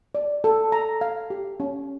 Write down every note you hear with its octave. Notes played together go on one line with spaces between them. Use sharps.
D5
A4
A#5
F5
G4
C#4